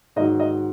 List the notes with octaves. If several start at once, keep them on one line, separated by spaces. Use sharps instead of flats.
G#2 D#3 F#3 D#5
D#5